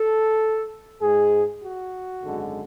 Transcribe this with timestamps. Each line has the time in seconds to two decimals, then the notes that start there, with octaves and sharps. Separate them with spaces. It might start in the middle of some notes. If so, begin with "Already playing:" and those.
Already playing: A4
1.01 G#2 G#3 G#4
1.62 F#4
2.22 G#1 F#2 D3 G#3